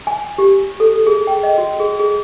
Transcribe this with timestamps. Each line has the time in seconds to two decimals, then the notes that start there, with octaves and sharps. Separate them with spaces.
0.07 G#5
0.38 G4
0.80 A4
1.07 G#4
1.27 G5
1.43 D#5
1.58 F#4
1.80 G#4
1.99 G#4